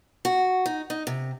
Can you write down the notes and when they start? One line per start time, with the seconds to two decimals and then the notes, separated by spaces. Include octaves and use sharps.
0.25 F#4
0.66 D#4
0.90 D#4
1.07 C3